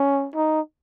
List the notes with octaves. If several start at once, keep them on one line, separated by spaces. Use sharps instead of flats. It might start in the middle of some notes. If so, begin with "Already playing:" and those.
Already playing: C#4
D#4